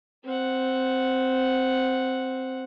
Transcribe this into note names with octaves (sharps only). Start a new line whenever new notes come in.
C4 F#5